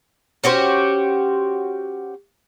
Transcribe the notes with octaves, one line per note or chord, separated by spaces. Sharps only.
C#4 F#4 G4 C5